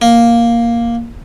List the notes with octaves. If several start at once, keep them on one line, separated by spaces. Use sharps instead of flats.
A#3